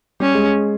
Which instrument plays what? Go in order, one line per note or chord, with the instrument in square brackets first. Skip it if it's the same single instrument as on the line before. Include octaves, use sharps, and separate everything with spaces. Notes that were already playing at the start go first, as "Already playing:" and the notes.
[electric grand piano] G3 G4 [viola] C#4
[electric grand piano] G#3 G#4